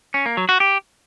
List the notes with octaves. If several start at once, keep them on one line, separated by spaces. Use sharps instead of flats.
C#4
A#3
F#3
F#4
G4